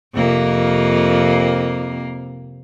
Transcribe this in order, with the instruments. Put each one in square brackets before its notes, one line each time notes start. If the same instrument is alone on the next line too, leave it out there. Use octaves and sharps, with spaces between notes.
[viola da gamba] F2 C3 A#3